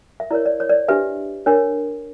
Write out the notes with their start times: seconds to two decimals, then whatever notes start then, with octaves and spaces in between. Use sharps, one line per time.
0.20 E5
0.31 E4 A#4 C#5 D5
0.46 D5
0.60 C#5
0.69 D5
0.88 D4 G4 B4 E5
1.46 D4 A#4 C#5